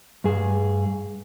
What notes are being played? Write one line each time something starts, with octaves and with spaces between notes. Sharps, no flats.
G2 G#4